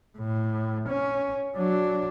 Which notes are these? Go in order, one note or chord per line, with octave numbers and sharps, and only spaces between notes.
A2
C#4
F#3 D4